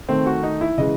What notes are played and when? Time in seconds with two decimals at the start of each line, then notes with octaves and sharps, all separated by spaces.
0.09 D#3 A3 C4
0.26 F#4
0.43 D#4
0.61 E4
0.78 C#3 E3 G#3 D#5